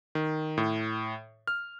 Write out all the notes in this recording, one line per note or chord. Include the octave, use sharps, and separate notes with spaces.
D#3
A2
F6